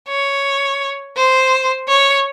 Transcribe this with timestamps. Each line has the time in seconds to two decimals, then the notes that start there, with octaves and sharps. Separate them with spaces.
0.09 C#5
1.17 C5
1.88 C#5